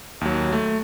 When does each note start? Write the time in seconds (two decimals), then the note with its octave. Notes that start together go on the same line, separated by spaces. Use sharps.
0.21 D#2 F#3
0.53 A3